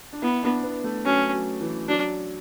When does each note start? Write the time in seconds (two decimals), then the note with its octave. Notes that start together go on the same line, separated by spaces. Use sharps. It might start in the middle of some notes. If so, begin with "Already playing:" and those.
0.13 D4
0.22 B3 E4
0.43 D4
0.63 B3
0.84 A3
1.05 F#3 C#4
1.33 F#3
1.61 E3
1.88 F#3 D4